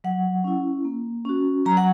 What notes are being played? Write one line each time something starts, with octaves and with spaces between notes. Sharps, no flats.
F#3 F#5
C#4 E4
A#3
C#4 F#4
F#3 A#5
F#5